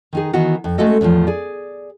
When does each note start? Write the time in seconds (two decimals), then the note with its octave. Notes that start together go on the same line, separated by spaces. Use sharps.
0.13 D#3 D#4 G#4
0.33 D#3 E3 B3 F#4 F#5
0.64 F2
0.78 G#3 A3 C#4 F#4 A4 D#5
1.01 E2 A2 E3 F3
1.27 G#4 D5